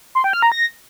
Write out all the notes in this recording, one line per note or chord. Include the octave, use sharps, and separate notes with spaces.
C6
G5
F6
A#5
A#6